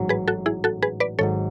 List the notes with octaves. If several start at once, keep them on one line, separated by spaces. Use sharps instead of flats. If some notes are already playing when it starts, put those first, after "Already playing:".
Already playing: A1 G#2 F#3
G#4 B4
F#4 A4
E4 G#4
F#4 A4
G#4 B4
B4 D5
G#1 G#2 F#3 A4 C#5